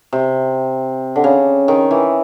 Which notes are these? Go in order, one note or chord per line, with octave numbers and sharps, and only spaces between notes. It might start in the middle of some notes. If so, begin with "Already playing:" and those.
C3
D3
C#3
D#3
E3